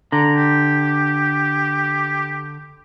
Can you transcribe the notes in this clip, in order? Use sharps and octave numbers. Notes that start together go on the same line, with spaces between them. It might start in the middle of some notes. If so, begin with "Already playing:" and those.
D3 A#5
G4